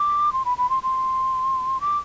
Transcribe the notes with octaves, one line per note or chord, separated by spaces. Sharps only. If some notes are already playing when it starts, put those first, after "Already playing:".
Already playing: D6
C6
B5
B5
C6
C6
D6